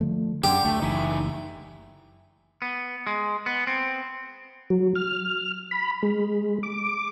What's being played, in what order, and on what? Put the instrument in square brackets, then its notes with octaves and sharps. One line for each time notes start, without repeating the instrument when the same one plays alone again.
[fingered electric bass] D3 F3 A3
[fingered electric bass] F#2 [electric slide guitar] D3 [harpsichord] G4
[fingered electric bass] D2 [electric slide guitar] A3
[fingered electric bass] F#1 E3 [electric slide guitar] D#4 E5 G#5
[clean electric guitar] B3
G#3
B3
C4
[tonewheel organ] F#3
F6
B5
G#3
D6